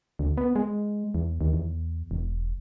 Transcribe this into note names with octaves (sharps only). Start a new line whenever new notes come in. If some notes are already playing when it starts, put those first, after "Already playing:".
D2
B3
G#3
E2
D#2
E2
E1